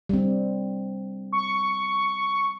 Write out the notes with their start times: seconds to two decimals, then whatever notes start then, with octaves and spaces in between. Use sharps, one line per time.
0.09 G3 C4
1.33 C#6